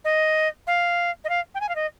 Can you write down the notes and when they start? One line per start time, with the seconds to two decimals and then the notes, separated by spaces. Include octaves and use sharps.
0.04 D#5
0.67 F5
1.24 D#5
1.29 F5
1.54 G5
1.60 G#5
1.69 F5
1.75 D#5